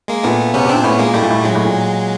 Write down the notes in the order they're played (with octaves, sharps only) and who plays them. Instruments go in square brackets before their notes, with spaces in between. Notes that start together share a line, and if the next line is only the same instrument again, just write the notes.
[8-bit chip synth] G#3 A#3
[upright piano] A#2 [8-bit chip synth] A3 B3
[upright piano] C3 [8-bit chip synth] B3 C#4
[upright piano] C3
[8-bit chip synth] C4 D4
[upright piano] A#2
[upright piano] A2 [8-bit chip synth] B3 C#4
[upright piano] A#2 [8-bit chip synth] G#3 A#3
[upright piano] A2 [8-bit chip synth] G3 A3
[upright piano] A#2
A2
[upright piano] A#2 [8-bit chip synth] F#3 G#3
[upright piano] A2
A#2